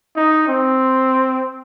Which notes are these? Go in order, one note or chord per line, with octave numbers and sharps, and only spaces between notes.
D#4
C4